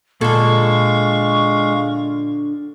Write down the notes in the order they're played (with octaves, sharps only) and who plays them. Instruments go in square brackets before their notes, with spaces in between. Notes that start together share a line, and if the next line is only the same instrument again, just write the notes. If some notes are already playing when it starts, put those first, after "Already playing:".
[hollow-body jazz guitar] A#2 [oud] D3 A4 [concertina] G#3 F5 [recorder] C#6